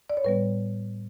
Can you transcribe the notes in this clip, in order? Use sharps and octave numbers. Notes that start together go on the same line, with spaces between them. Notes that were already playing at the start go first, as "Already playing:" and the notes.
D5
C#5
A2 G3 B3 B4